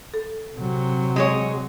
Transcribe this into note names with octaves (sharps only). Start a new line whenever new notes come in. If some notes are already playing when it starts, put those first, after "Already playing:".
A4
C3 F#3
G#3 G#4 C#5